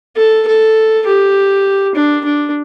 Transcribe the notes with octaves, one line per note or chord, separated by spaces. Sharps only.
A4
A4
G4
D4
D4